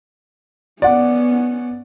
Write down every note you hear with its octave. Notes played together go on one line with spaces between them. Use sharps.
B3 C#4 D5 F#5